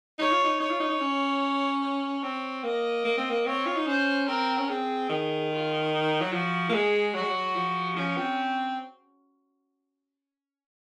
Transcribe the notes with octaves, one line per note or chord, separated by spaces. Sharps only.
D#4 C#5
F4
D#4
D#4 C#5
F4
D#4
D#4
C#4
C#5
C4
A#3 D#5
A#3
C4
A#3
C4 C#5
F4
D#4
C#4 C5
C4 A#4
C#4
C4 G#4
D#3
F4
D#4
F#3
F3 F#4
A#3
G#3 G#4
F#3 F#4
G#3
F#3
F3
F3 C#4
C4